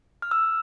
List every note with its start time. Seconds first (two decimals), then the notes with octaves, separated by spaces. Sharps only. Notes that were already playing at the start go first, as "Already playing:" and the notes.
0.22 F6
0.31 E6